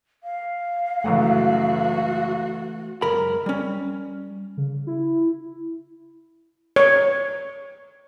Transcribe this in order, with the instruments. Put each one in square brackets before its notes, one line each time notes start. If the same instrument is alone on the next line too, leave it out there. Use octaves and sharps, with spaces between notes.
[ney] F5
[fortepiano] C#2 F#2 F#5 [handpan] E3 A3 [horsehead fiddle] F#4
[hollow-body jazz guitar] C#2 F#2 A#4 B5
G3 C#4
[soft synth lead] C#3
E4
[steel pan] C#5